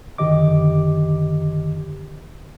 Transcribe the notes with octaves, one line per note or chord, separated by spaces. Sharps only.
F#2 D3 D#3 G4 D#5 D6